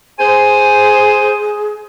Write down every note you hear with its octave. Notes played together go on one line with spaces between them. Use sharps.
G#4 C5 G#5